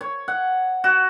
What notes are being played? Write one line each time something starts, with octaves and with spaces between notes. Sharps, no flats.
C#5
F#5
F#4